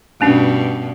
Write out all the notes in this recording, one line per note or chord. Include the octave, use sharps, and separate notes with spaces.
G2 B2 A3 C#4 D4